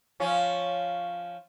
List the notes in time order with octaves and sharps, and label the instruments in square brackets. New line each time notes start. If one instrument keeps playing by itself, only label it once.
[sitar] F3 C#4